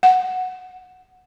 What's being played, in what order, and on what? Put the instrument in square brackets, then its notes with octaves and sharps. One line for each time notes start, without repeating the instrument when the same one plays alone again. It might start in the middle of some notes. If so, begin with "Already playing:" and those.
[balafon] F#5